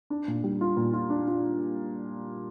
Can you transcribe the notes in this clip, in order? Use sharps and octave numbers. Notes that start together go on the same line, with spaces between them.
D4
A#2
G3
F4
A#2
F4
D4
F4